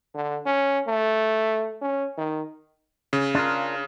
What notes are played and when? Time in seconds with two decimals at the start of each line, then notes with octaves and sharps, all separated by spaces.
0.14 D3
0.46 C#4
0.87 A3
1.81 C#4
2.17 D#3
3.13 C#3
3.35 D4 F4 A#4